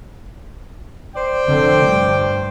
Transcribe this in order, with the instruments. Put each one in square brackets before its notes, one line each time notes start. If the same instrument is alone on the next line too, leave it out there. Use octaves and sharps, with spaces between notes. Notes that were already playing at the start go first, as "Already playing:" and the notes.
[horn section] C5 D5 G5
[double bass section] F1 D3 C4
G2